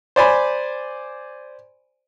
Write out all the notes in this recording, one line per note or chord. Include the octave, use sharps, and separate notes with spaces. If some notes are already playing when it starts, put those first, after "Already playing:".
C5 D5 G#5 B5